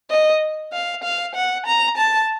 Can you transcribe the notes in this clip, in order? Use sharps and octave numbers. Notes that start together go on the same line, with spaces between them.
D#5
F5
F5
F#5
A#5
A5